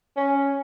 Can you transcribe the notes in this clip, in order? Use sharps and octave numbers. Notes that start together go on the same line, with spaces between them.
C#4